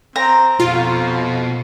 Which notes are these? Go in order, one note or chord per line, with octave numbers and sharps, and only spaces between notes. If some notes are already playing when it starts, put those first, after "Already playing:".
C4 A#5
F2 B2 F4